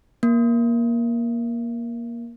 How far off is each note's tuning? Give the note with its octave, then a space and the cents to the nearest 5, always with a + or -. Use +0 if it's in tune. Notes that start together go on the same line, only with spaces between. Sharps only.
A#3 +15